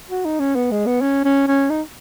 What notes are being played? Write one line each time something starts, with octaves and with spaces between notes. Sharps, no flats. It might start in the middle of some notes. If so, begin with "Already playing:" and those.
F#4
D#4
C#4
B3
G#3
B3
C#4
C#4
C#4
D#4